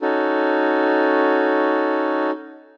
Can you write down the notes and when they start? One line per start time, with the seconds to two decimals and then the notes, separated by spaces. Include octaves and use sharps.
0.02 C#4 D#4 F#4 A4